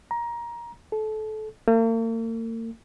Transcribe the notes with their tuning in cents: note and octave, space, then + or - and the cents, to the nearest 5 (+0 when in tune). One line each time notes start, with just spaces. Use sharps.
A#5 +20
A4 -25
A#3 -45